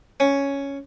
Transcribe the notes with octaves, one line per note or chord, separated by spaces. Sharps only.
C#4